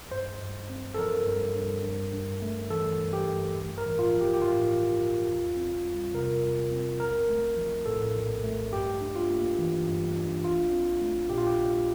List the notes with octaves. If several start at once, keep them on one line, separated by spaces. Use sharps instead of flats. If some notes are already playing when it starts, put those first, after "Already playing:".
G2 C5
G2
C4
A4
F3 A#4
G2
G2
G2
G2
A3
E3 A4
G2
G4
G2
A1
A#4
A1
F4
F3
G4
G4
A2 F4
A1
A1
E2
C4
G3
C3 A#4
E2
C4
A#1 A#4
A3
F3
A2 A4
A#1
A3
G2 G4
D4
F4
A#3
E3
G2
D4
A#1 F4
C4
A3
A#2 G4
F4
G4
A#1